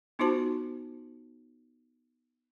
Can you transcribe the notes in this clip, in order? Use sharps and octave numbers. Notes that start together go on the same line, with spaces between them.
B3 D#4 F4 F#4 C5 A5